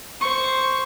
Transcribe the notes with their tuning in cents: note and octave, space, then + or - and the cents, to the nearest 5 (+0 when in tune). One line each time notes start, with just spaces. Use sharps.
C5 +0 C#6 +0